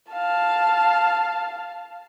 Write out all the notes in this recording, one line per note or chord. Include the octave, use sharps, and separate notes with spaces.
F5 A5